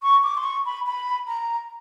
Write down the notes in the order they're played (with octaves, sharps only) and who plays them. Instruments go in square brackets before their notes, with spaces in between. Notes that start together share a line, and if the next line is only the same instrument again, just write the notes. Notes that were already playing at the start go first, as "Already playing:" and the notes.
[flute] C#6
D6
C6
C#6
B5
B5
A#5